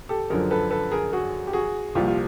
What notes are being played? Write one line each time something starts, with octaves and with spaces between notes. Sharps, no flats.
G4 A4
F#2 D3 F3 G#4 A#4
A4 B4
A4 B4
G#4 A#4
F#4 G#4
G4
F#4 G#4
C2 A#2 F3 F4 G4
F4